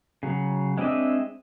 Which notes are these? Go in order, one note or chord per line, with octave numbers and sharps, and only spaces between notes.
C#3 F#3
G#3 C4 D4 D#5 E5